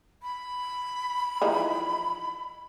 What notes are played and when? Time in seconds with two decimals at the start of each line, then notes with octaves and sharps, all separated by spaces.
0.22 B5
1.42 E3 F3 D#4